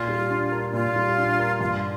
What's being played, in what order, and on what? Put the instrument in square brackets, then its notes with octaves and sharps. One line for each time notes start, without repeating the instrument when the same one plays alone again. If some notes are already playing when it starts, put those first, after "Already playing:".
Already playing: [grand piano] A#2 [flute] F4
[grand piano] G3
D4
A#4
[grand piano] A#2 [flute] F4
[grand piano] G3
D4
A#4
[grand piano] G2 [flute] F4